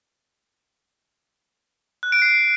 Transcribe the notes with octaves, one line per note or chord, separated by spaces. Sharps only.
F#6
D7
C7